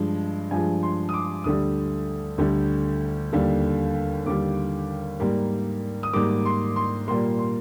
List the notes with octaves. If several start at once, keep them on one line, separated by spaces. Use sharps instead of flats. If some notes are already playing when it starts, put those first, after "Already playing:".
Already playing: G2 F3 G#3
G2 F3 G#3 G#5
C6
D#6
D6
D2 D3 G3 D#6
D2 D3 G3
D#2 D3 G3
D#2 D3 G3 D6
G#2 G3 A#3
D#6
G#2 G3 A#3 D6
C6
C6
A#2 G3 A#3 C6
C6